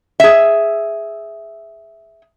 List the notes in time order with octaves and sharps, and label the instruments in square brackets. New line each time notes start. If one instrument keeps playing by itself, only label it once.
[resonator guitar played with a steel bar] G#4 E5